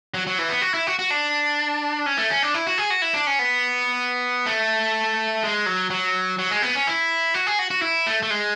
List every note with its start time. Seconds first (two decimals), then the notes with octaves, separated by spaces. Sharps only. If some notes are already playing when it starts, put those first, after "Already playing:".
0.14 F#3
0.27 F#3
0.39 E3
0.50 B3
0.62 F#4
0.74 E4
0.87 F#4
0.99 F#4
1.11 D4
2.06 C#4
2.18 A3
2.30 C#4
2.43 D4
2.54 E4
2.67 F#4
2.78 G#4
2.90 F#4
3.02 E4
3.14 D4
3.27 C#4
3.39 B3
4.46 A3
5.43 G#3
5.66 F#3
5.90 F#3
6.39 F#3
6.51 G#3
6.62 B3
6.75 C#4
6.87 E4
7.34 F#4
7.47 G#4
7.59 F#4
7.71 F#4
7.82 E4
8.07 A3
8.23 A3
8.30 G#3